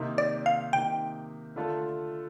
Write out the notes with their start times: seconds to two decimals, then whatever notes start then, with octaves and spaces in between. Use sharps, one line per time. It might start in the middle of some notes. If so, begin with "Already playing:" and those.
Already playing: C3 D#3 A#3 D#4
0.18 D5
0.46 F5
0.73 C3 D#3 A#3 D#4 G5
1.56 D3 A3 D4 F4 A4